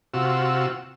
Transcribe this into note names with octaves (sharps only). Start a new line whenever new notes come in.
C3 F4 F#4 E6